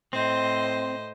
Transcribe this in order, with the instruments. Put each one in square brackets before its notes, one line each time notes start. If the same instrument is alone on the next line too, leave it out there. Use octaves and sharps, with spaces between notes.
[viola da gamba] A2 C5 D#5 [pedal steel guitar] C4